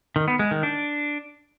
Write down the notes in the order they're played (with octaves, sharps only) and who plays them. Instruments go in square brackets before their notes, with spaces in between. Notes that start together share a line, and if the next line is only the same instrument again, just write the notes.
[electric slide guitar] D#3
B3
G#3
D#3
D4